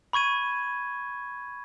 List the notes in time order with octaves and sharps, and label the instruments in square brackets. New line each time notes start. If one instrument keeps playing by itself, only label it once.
[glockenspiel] B5 C#6 G#6 D#7